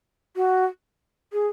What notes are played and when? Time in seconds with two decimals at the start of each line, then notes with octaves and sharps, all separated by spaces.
0.36 F#4
1.33 G#4